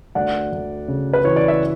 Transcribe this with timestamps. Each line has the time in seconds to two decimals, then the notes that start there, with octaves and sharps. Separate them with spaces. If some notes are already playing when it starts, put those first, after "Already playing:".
0.15 D2 D5 F#5
0.52 D2
0.88 C#3
1.13 B4
1.25 E3 C#5
1.36 D5
1.48 E5